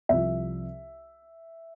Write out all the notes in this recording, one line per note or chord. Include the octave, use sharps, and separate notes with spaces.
C2 C3 F3 E5